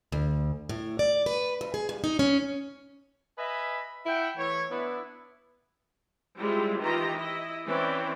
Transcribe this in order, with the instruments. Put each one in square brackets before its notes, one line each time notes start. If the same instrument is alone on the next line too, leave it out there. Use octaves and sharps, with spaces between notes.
[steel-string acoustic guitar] D2
A2
D5
B4
D2
G#4
G2
D#4
C#4
[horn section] B4 D#5 E5 G#5 B5
E4 E5 F#5 G5
E3 A3 E4 C#5
B3 D4 E4
[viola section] G3 G#3 C4 E4 F4
D#3 E3 F4 G4 D#5 A#5
E4 D#5
E3 C4 C#4 E4 D5